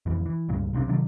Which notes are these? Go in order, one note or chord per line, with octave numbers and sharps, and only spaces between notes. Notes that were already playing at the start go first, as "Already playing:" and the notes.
F2 A#2 E3
E3
C#2 G2 A#2
B1 C3 C4 D4
C3 D#3 F#3 D4